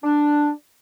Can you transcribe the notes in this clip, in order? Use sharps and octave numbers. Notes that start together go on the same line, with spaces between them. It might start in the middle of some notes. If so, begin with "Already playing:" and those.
D4